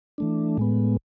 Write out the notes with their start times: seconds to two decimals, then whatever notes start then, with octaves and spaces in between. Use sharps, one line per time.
0.18 E3 A3 D4
0.57 A2 G#3 B3